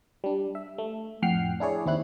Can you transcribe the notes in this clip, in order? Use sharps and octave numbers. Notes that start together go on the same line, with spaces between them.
G3 D4
E5
A3
F2 A2 F#5 G5 F6 C7
D4 E4 G#4 C#5 D5
D#2 C4 E4 F#6